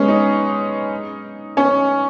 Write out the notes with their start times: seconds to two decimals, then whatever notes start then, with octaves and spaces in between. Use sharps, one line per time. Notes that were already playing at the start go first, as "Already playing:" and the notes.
Already playing: G#3 B3 C#4
0.08 D#4
1.57 C#4